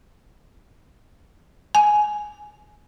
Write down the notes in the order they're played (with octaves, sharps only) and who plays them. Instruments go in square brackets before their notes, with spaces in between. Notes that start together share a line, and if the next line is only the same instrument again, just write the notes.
[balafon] G#5